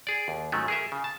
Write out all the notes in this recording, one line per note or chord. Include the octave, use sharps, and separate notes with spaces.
G#4 D5
D#2
G#2 D#3 F#3 A3 C#4
G#4 A#4 E5
C#3
A5